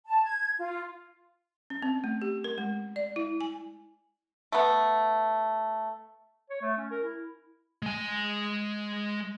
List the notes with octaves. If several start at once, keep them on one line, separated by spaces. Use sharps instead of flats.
A5
G#6
F4
C#4
C4
A3
G4
A#4
G#3
D5
E4
G#5
A3 B3
C#5
A3
C#4
A#4
E4
G#3 G#5